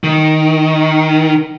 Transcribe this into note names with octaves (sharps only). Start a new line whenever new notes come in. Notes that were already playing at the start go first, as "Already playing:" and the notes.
D#3